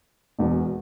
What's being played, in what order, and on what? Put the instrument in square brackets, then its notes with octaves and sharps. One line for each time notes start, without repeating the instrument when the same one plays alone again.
[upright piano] E1 E2 B2